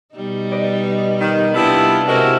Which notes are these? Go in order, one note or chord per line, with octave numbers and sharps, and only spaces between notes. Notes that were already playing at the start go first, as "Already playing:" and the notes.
B2 G3 D#4
B4 D5 D#5
D#3
C3 G3 B3 D4 E4 F4 A5
C3 G#3 E4 F#4 A#4 C5 D#5 F#5